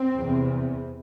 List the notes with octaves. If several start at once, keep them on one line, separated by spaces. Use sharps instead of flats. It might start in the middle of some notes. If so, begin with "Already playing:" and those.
Already playing: C4
E2 C3